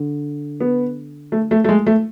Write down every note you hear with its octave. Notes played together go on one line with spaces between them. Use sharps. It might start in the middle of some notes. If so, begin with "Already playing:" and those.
Already playing: D3
B3
A3
A3
A3
G#3
A3